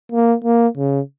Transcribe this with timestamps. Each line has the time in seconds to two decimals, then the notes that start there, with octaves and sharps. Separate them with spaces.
0.12 A#3
0.45 A#3
0.78 C#3